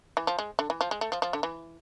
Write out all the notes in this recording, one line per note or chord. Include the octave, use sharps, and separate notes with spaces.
E3
F3
G#3
D3
E3
F3
G#3
A3
F3
F3
D3
E3